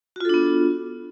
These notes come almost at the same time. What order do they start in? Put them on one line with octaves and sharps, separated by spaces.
F#4 F4 A4 D4 B3